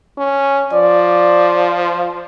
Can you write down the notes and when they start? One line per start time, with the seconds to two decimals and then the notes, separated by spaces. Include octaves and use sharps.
0.18 C#4
0.73 F3 D5